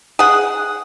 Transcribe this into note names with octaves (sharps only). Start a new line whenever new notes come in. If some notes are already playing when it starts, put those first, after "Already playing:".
G#4 F#5